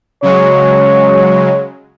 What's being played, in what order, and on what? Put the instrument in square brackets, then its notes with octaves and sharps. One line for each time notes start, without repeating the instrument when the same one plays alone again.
[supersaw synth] C#3 F#3 G#3 [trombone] C#5